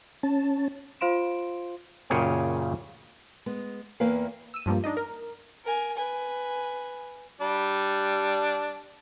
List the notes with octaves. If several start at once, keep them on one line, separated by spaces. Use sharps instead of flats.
C#4 A5
F4 C5 F5 C6 D7 E7
F#2 A#2 C#3 G#4 C#5 G5
G#3 B3
E2 E3 A#3 B4 F5 G5
E6 D#7
G2 F3 G3 A#3
D4 D#4 D#5
A#4
A#4 G#5
B4 G#5
G3 D4